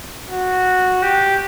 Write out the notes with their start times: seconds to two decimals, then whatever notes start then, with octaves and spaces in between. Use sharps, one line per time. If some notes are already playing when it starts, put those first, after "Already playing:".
0.28 F#4
1.03 G4